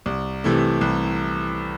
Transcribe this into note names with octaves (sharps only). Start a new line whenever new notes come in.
C2
C3 E3 A3
C2